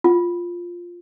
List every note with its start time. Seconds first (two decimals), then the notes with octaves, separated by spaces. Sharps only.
0.04 F4